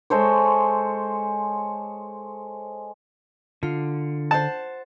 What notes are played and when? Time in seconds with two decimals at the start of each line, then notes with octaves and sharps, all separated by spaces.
0.10 G#3 A4 C5 C#5
3.63 D3 F4
4.31 C5 F#5 A5